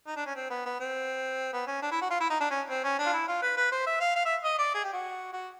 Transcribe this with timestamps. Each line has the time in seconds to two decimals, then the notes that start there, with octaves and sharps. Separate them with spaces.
0.07 D#4
0.16 D4
0.26 C#4
0.36 C4
0.50 B3
0.65 B3
0.80 C4
1.53 B3
1.67 C#4
1.82 D4
1.91 E4
2.01 F#4
2.11 F4
2.20 E4
2.30 D#4
2.40 D4
2.50 C#4
2.70 C4
2.84 C#4
2.99 D4
3.06 F4
3.13 E4
3.28 F4
3.42 B4
3.57 B4
3.72 C5
3.86 E5
4.00 F5
4.16 F5
4.25 E5
4.44 D#5
4.59 D5
4.74 G#4
4.84 G4
4.93 F#4
5.33 F#4